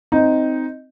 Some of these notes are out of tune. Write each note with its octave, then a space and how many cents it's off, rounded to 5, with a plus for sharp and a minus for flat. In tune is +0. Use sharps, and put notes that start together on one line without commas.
C4 +0 D#4 +0